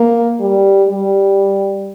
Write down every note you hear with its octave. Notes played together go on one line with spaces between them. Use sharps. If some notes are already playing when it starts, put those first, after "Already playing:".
Already playing: A#3
G3
G3